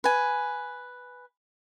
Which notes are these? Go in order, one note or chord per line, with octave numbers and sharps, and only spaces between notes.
B4 G#5